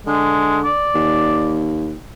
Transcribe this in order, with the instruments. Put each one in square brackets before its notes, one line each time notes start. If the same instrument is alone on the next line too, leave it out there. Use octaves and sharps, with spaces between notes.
[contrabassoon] D3 [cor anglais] G#3
[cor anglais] D5
[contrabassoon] D#2